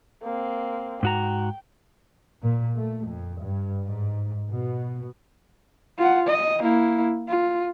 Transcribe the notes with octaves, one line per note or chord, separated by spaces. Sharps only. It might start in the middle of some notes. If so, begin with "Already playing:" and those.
A#3 C4
G#2 F#4 G5 A#5
A#2
A3
F2
G2
G#2
B2
F4 F#5
D#5
A#3 E4
F4